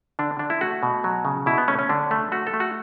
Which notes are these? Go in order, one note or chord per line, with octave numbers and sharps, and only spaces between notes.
D3 D4
D3 D4
E4
A3 F#4
B2
F#3
C#3
B2 E4
B3
A3 C#4
C#4
D3 D4
A3
A3 F#4
A4
A3
F#4